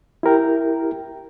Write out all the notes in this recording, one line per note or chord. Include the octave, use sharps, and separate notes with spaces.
E4 G4 A#4 G5